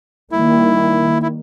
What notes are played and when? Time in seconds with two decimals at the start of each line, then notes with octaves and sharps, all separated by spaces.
0.32 D#3 G3 A#3 E4
1.22 E4